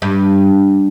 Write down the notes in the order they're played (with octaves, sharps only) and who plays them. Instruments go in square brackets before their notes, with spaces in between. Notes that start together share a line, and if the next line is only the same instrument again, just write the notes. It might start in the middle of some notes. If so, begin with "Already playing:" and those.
[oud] G2